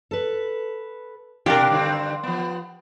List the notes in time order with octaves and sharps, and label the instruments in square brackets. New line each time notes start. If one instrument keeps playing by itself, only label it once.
[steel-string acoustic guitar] A4 B4
[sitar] B2 D4 [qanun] G4 A#4 [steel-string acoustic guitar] F5
[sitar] G2 D3 C4
F3 B3